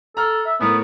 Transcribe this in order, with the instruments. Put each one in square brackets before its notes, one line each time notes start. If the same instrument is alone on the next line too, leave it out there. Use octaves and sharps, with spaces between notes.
[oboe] A4 [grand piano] A#5 F6
[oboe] E5
[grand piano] A2 A3 A#4 [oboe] B3